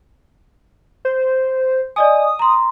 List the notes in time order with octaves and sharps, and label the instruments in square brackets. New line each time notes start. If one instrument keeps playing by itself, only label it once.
[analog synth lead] C5
[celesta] D5 D#5 G#5 [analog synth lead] D#6
[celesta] A#5 C6